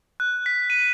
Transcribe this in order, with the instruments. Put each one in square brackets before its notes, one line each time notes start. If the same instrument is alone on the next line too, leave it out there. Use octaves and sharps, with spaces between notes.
[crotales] F#6
B6
D#7